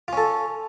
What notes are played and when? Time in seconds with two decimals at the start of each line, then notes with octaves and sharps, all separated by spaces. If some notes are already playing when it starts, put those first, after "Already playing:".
0.08 F4
0.13 C#4
0.17 A4